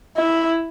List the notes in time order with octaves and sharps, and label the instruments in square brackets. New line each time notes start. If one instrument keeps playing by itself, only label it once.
[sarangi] E4